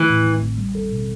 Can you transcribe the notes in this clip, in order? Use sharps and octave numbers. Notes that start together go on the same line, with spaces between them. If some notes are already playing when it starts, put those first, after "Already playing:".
Already playing: E3 A3
A2
A1
A1
G3
A4
B2